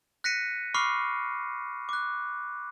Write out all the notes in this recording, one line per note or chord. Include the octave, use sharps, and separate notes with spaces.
F#6 A#6 B6 C#7 D#7
B5 C#6 D6 F6 C7
D6 F#6